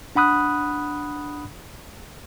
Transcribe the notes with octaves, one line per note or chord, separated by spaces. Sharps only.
D4 F#5 B5 D#6 F#6